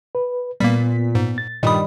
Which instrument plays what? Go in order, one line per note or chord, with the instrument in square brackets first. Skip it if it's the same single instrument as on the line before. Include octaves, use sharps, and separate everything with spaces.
[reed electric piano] B4
[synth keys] A#2 B6 [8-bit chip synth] G3 A#3 [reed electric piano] B3
[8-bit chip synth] G#2
[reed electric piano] A6
[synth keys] G2 D#3 G3 [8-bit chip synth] A#2 D#6 [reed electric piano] D#5 B5